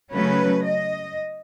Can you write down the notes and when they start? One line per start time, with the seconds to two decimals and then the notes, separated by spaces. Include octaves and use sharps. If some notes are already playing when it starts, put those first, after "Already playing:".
0.12 C#3 F#3 A3 C#4 B4
0.64 D#5